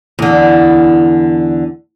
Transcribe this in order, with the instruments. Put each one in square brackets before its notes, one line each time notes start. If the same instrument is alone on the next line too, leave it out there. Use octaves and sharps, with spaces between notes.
[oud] E2 D3